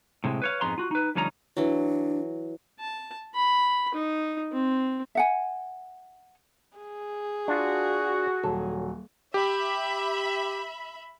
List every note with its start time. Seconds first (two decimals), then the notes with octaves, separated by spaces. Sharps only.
0.24 A2 C3 G#3
0.42 B4 C#5 F5
0.61 F2 G#2 G#3 B3 A#5 C6
0.78 F4 F#4
0.91 D#4 B4
1.15 D2 F3 G3 C#4 D#4 A#5
1.57 E3 F#3 D4
2.79 A5
3.35 B5
3.94 D#4
4.52 C4
5.15 E5 F#5 G#5
6.77 G#4
7.48 D4 F4 F#4
8.44 D#1 F#3 A4
9.34 G4 E5 B5